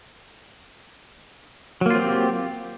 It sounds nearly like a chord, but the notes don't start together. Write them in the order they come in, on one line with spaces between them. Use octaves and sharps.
F#3 A#3 F4 C4 G4